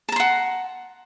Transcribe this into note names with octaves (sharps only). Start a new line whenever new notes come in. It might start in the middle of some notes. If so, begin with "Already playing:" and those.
F#5 A5 A#5 C6